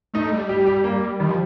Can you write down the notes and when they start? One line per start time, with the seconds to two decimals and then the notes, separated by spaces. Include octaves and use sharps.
0.14 A3 D#4
0.32 G3
0.49 G4
0.66 G4
0.84 A#3
1.20 D#3 G3
1.28 F3